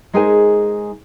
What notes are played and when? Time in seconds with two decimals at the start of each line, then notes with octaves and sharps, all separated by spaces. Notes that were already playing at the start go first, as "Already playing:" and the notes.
0.13 G#3 D#4 G#4 A#4 C5 G#5